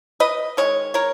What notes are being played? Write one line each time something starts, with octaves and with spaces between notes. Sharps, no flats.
B4 D#5
D#3 G#3 C#5
A#4 C#5